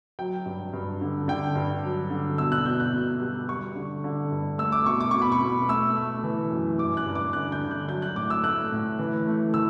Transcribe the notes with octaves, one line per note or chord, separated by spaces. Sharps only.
F#3 G5
G2
G2
D3
D3 G5
G2
F#3
D3
B2 E6
F#6
B2 G6
F#6
B2
G3
G3 C#6
D3
D3
G2
A3 E6
D6
B2 C#6
D6
B2 C#6
B5
C#6
B2
A3 E6
A3
E3
F#2
G2 D6
F#6
G2
D6
D3 F#6
G6
D3
F#6
F#3 G6
F#6
A2 D6
E6
A3 F#6
A2
E3
A3
E3 E6